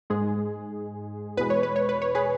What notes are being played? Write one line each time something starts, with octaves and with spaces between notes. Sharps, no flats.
G#2 G#3 G#4
E2 B2 G#3 B4
C#5
B4
C#5
B4
C#5
G#4 B4